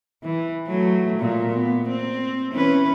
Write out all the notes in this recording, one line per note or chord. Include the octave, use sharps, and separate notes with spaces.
E3
F#3 A3
A#2
B3
C4
E3 C#4 B4